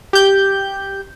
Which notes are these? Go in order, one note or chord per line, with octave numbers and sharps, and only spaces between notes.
G4 G6